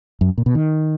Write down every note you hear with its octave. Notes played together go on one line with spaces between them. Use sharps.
F#2
A#2
B2
D#3